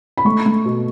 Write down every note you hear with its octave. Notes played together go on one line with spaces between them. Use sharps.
B5
A3 C#6
A3
B2